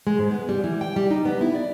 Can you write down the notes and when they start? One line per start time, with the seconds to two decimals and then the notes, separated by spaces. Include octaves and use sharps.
0.07 G#3
0.19 G#2
0.31 B3
0.49 G3
0.64 E3
0.81 G5
0.96 G3
1.11 D#4
1.25 B3
1.41 E4
1.55 D5